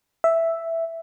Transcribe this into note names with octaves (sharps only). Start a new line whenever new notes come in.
E5